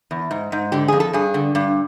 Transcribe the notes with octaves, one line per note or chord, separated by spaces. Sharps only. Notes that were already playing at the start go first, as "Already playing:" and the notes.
E2
G#2
G#2
D3 G4
F2 G#4
A4
G2 G#4
D3
G2